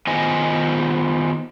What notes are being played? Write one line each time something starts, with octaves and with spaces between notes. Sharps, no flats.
D#3 B3 F4 C5 D#5 G#5